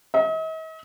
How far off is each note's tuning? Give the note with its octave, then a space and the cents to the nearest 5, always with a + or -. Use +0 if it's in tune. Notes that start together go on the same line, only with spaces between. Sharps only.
D#5 +45